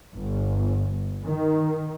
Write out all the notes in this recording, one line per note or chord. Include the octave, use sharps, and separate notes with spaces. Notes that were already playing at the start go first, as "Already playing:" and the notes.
G1
D#3